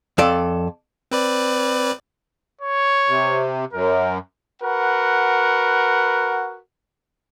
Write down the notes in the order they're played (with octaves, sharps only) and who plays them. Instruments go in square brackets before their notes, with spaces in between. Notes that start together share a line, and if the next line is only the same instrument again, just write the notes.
[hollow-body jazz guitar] F2 A4 D5
[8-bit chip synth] C4 B4 D5
[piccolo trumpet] C#5
[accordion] C3
[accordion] F#2 [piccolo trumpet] A#4
[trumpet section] F#4 A#4 B4 F#5